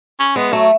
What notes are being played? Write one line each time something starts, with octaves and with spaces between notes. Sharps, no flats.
C#4
G#3 B3
F#3 A3